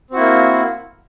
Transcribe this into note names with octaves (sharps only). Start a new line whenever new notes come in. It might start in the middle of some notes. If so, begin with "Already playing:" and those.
A#3 C4 E4 F#4